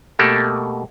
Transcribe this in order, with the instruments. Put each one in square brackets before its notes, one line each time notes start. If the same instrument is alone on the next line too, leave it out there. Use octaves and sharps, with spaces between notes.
[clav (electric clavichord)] B2 A3 A#3 G4 A4